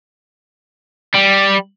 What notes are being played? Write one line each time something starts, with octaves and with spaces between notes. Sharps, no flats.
G3